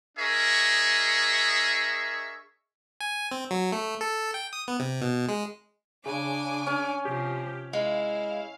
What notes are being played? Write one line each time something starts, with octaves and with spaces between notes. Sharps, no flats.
D4 G#4 A#4 D#5 E5 C#6
G#5
C4
F#3
A3
A4
G5
D#6
B3
C3
B2
G#3
C#3 D4 G#5 D6
C#4
C3 F3 G4
G#3 E4 F5